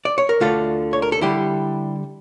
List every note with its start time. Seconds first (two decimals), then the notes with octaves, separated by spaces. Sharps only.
0.05 D5
0.18 C#5
0.29 A#4
0.41 D2 D3 A3 F4 A4
0.93 C#5
1.02 A#4
1.12 A4
1.21 D3 G3 E4 G4